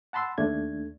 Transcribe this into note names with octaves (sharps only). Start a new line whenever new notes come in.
F#5 A5 B5 C6 E6
D#2 A3 D4 G#6